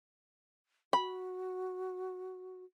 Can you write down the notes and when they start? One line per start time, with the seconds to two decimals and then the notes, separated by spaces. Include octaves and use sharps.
0.93 F#4 B5